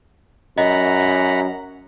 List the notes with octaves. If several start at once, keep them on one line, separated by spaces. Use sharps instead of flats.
F#2 D#5 F#5 A#5 B5